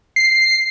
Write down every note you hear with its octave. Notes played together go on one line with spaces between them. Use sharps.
C7